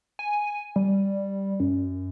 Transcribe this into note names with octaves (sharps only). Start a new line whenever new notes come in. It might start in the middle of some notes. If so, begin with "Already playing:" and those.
G#5
G3
F#2